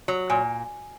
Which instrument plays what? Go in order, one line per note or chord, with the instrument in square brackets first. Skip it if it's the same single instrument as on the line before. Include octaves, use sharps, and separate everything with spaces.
[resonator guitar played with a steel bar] F#3
[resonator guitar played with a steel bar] A#2 [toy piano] G#5